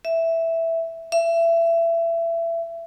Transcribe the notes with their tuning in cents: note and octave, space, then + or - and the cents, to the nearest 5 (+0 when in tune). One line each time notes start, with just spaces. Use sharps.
E5 +0
E5 +25